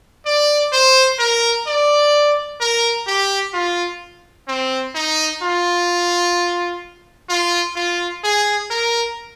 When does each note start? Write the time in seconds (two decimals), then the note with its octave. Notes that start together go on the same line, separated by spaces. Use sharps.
0.26 D5
0.73 C5
1.19 A#4
1.66 D5
2.60 A#4
3.07 G4
3.53 F4
4.48 C4
4.95 D#4
5.42 F4
7.29 F4
7.76 F4
8.24 G#4
8.70 A#4